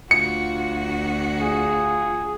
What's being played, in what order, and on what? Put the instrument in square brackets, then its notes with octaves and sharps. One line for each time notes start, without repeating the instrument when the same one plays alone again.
[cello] D2 F#4 [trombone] F4 [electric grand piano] C#7
[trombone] F4 [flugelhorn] G#4